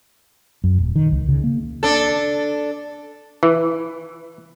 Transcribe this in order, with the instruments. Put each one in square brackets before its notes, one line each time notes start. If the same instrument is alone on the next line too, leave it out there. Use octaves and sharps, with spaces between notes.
[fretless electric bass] F#2
D#1
D#3
C#2
C#3
A#3
[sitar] D4 A4
[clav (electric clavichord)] E3